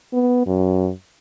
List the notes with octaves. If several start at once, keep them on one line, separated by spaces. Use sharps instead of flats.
B3
F#2